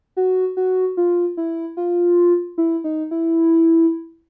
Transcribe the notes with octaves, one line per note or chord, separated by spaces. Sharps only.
F#4
F#4
F4
E4
F4
E4
D#4
E4